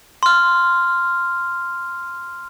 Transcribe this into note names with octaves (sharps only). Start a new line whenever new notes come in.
C6 F6